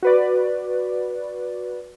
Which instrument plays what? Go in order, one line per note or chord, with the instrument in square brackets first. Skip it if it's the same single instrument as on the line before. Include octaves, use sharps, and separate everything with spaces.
[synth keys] F#4 B4 D5